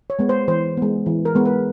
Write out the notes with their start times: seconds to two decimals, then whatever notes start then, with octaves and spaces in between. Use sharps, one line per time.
0.10 C#5
0.19 G#3 B3
0.29 C5
0.48 E3 C5
0.77 G#3 B3
1.06 E3
1.25 A#4
1.35 G#3 B3
1.46 B4